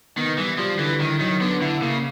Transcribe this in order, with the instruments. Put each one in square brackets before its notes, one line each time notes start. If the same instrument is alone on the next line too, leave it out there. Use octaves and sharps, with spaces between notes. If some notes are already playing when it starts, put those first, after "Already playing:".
[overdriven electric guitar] D#3 [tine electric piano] B3
[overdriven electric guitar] E3 [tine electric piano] G3
[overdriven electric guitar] F3 [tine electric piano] G3
[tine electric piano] D3 [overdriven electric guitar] E3
[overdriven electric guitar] D#3 [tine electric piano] E4
[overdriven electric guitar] D#3 [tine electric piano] F#3
[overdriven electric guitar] D3 [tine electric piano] B3
[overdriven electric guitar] D3 [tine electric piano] E4
[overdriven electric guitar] C#3 [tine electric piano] A#3